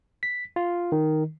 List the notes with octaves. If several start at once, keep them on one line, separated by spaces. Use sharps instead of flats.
B6
F4
D#3